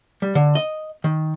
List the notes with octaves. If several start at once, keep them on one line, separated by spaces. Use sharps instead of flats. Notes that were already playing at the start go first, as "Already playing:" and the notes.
G3
D3
D#5
D#3